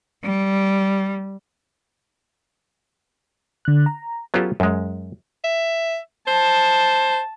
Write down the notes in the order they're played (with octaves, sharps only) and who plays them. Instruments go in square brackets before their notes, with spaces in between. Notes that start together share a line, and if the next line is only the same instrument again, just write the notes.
[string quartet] G3
[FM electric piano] D3 F#6
A#5
[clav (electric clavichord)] F#3 B3 C#4 F4 G4 A4
F#2 G#3
[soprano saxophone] E5
[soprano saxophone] C5 [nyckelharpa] A5